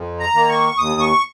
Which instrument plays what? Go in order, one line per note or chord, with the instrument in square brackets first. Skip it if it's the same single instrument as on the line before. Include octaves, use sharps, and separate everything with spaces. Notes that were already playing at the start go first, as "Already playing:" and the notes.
Already playing: [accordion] F2
A#5
D#3 A#3
C#6
D#2 D#6
C#6